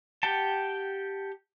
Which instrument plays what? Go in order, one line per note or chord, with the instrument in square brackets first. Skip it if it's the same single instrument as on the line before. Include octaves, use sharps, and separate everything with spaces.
[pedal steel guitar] G4 F#5 G5 A5